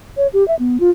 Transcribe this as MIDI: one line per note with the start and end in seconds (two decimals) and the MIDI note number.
0.17 0.27 73
0.33 0.46 67
0.48 0.55 76
0.59 0.77 59
0.80 0.90 65